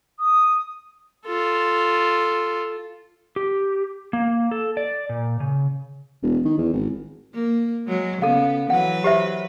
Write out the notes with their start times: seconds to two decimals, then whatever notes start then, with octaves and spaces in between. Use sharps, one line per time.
0.20 D#6
1.26 F4 A4
3.36 G4
4.13 A#3
4.51 A4
4.77 D5
5.09 A#2
5.40 C#3
6.23 E1
6.45 D#3
6.58 E2
6.74 G#1
7.34 A#3
7.87 F#3 G#3
8.22 C#3 B3 A4 F5
8.70 E3 F#3 B4 F#5
9.04 G4 C5 E5